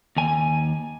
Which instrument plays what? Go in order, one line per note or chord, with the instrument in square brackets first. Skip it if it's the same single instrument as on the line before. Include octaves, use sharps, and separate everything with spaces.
[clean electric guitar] D#2 G#5